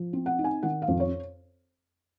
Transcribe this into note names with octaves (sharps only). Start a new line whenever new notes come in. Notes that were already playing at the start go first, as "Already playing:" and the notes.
Already playing: F3
C4
F#5
D#4
G#5
D#3 F#5
F5
F2
C#5